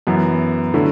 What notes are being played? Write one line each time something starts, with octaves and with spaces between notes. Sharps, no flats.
F#2 E3 B3
D3 F#3 A3 E4